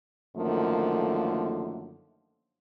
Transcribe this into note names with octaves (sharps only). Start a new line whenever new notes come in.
F#2 D3 D#3 F3 A3 A#3